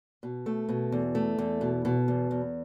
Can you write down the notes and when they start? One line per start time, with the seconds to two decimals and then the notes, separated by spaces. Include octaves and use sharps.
0.23 B2
0.46 A3
0.69 B2
0.92 E2
1.15 A3
1.39 E2
1.61 B2
1.85 B2
2.08 E2
2.31 E2